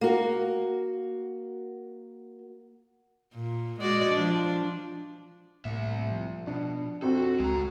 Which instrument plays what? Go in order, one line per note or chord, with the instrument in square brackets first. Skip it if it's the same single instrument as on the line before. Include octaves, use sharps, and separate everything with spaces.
[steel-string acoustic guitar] A#3 F#4
[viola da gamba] A#2
G#3 F#4 D5
F3 D4
[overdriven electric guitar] C2 E5 [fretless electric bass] A2 A#3
[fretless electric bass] F3
[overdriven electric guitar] B2 [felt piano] D4
[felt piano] F2 C4 [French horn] F#4 [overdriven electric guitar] A4
[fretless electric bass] C#2 [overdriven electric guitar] G#3 A#5